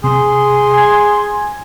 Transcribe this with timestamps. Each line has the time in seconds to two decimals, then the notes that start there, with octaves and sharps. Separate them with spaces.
0.04 C3 G#4 C6
0.74 G#5 G#6